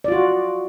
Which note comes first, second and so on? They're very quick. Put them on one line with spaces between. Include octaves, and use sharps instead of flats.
D5 F4 F#4